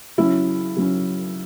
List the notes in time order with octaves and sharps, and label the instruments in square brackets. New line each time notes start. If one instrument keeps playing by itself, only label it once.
[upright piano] C#3 F#3 C#4 E4
C#3 F#3 C#4